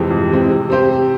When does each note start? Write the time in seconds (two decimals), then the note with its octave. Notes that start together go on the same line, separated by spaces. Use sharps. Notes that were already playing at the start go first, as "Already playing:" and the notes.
Already playing: F2 C3 E3 G#3 C4
0.10 F2
0.30 C3 E3 G#3 C4
0.50 C3
0.69 G3 C4 G4 C5
0.90 C3